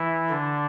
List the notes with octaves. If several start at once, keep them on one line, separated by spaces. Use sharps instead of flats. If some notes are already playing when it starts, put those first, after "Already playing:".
Already playing: E3 E4
D3 D4